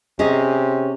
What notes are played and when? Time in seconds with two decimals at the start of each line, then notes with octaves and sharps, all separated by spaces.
0.19 C3 C#4 G#4 D#5